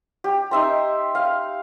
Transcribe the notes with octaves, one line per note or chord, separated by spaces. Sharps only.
G4
D#4 E5 C6
F5